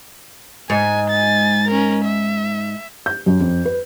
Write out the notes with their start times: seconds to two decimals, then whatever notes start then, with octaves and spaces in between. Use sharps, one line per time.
0.70 G#2 G#5
1.10 G#5 A6
1.68 C#4 A#4
2.05 E5
3.06 G6
3.26 F#2
3.41 F2
3.65 B4